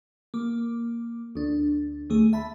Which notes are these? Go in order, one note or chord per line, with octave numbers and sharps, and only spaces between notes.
A#3 D6
D2 D4
D2 A3 G#4
E5 A5 B5